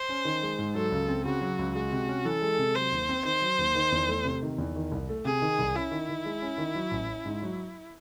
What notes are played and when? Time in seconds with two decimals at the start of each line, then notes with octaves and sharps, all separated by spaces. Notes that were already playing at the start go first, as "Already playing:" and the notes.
Already playing: C5
0.09 C#4
0.25 D#3
0.42 G#3
0.59 G#2
0.75 F#3 A4
0.92 C#2
1.09 C4
1.25 C#3 F#4
1.41 F#3
1.59 C#2
1.75 G#3 F#4
1.92 C3
2.08 C#4
2.25 E3 A4
2.42 G#3
2.59 C3
2.75 F#3 C5
2.92 D#2
3.09 C4
3.25 D#3 C5
3.42 F#3
3.59 D#2
3.75 D#3
3.92 E2
4.08 A3
4.25 C3
4.42 D#3
4.58 E2
4.76 D#3
4.92 C2
5.09 A3
5.25 C3 G#4
5.42 D#3
5.59 C2
5.75 C#4 E4
5.91 D#3
6.09 D#3
6.25 G#3
6.42 C#4
6.58 D#3
6.75 F#3
6.91 A1
7.09 C#4
7.26 G#2
7.42 F#3